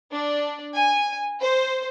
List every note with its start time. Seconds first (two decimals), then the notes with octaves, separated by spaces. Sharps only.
0.13 D4
0.75 G#5
1.39 C5